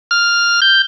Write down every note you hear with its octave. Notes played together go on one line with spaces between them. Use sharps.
F6
G6